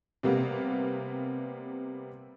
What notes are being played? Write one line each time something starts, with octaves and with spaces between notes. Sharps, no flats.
C3 G3 A#3 B3